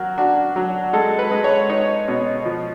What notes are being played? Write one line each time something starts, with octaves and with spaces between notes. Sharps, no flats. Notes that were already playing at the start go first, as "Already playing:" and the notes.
Already playing: F#3 F#4 A#4
D4 F#4
F#3
G#3 A4
B4
G#3
C#5
D#4 C#5
B2
F3